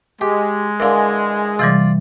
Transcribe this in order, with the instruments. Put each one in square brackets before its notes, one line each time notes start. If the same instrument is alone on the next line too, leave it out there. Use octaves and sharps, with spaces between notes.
[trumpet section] G#3 [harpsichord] G4
[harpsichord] D3 E3 [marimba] A#4 D5 F5
[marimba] C3 E3 G3 [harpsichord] F4 D5